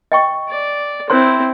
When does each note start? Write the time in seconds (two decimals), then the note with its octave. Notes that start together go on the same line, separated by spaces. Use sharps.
0.12 D#5 G5 C#6
0.50 D5
1.10 C4 E4 C5 C#5 C6